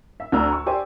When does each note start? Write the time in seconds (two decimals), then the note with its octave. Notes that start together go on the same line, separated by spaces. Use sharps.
0.20 E5
0.32 D2 D4 A#5 E6
0.52 C#6
0.66 G4 C5 D5 G#5